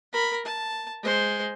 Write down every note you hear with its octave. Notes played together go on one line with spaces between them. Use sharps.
A#4 B5
A5
G#3 C5